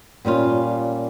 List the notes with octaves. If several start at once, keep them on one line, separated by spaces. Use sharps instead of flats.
A#2 G3 C#4 F4